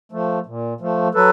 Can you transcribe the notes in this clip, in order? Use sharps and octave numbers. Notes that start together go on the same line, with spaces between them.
F3 A3
A#2
F3 A3
F#3 A4 B4